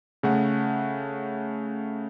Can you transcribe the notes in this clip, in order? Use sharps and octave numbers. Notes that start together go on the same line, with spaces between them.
C#3 A3 F#5